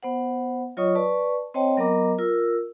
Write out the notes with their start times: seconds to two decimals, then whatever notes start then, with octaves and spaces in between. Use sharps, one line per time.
0.03 B3 C5 F#5
0.77 F#3 F4 C#5 D#5 C#6 D#6
0.95 B4 D5 A5 C#6
1.54 C4 C5 C#5 D#5 G5 A5
1.77 F#3 B3 A#4 D#5 A#5 D6
2.19 F4 A#4 E6